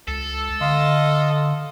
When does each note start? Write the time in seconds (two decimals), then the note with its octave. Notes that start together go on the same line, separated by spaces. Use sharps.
0.08 C#2 A4
0.61 D3 D#5 F5 C6